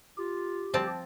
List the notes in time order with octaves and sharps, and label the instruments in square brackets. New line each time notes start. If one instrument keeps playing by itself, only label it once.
[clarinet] F4 [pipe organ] G4
[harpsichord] D2 G3 C5 [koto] F3 C4 A5